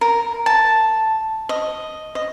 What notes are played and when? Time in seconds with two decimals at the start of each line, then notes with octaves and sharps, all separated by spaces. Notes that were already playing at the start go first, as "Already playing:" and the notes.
0.01 A#4
0.46 A5
1.49 D#5
2.15 D#5